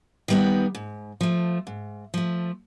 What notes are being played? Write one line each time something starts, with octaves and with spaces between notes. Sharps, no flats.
D#3 G3 B3 D#4
G#2
F3 A3
G#2
F3 A3